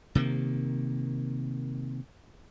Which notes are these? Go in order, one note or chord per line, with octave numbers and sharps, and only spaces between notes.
C3 D#3 A#3